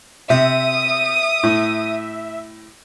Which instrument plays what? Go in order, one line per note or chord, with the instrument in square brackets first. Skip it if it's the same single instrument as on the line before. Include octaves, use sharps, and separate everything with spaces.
[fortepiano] C3 [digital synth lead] E5 [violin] D#6
[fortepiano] A2